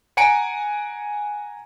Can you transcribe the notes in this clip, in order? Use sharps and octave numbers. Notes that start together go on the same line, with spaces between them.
F#5 G#5 A#5 C#7 D7